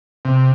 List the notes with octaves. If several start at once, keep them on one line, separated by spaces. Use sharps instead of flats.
C3